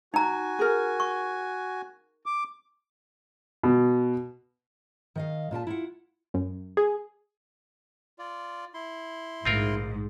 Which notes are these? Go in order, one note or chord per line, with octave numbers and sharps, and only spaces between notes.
D#4 F#4 G#5 A#5
G#4 A#4
C#6
D6
B2
D#3 D#5 F5
A#2 F4 A#4 A5
E4 F4 F#5
F#2
G#4
F4 D5
E4 C6
A#1 G#2 D3 A3 C4 F4 A#4